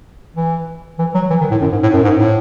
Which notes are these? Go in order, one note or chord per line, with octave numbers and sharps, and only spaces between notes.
E3
E3
F#3
E3
D#3
A2
F#2
G#2
A2
F#2
G#2
A2